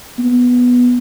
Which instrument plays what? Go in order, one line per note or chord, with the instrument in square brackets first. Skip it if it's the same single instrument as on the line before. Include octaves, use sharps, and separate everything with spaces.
[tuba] B3